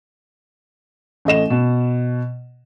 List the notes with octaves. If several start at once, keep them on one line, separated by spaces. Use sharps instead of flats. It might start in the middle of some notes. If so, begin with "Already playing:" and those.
A1 A3 D#5 E7
B2